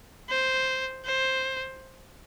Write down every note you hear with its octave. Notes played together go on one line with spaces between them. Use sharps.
C5
C5